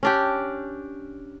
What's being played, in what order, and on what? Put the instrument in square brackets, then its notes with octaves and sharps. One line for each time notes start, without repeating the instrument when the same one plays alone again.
[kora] C#4 D4 G4